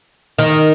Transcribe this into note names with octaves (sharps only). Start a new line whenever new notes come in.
D#3